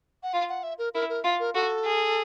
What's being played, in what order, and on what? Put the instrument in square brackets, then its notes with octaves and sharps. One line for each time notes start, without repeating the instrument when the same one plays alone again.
[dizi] F#5
[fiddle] F4 [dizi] F5
[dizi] F#5
E5
A#4
[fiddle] E4 [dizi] A#4
[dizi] A#4
[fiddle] F4
[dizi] A#4
[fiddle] F#4 [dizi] A4
[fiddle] G#4